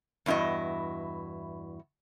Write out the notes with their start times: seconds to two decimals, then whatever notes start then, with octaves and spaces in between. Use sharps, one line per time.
0.26 E2 G2 E4 F#4 D#5